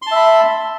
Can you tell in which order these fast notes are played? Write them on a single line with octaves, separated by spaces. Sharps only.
C6 A5 E5 B5